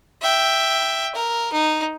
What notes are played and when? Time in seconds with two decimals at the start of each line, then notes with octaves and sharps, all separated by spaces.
0.21 E5 G5
1.15 A#4
1.53 D#4